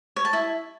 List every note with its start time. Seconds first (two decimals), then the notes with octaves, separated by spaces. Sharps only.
0.16 C#5
0.25 A5
0.33 E4